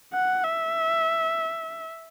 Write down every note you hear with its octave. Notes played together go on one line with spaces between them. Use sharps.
F#5
E5